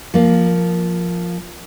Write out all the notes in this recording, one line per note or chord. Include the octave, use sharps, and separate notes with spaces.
F3 A#3